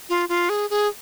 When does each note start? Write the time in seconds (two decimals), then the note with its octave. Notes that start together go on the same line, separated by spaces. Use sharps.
0.09 F4
0.29 F4
0.49 G#4
0.70 G#4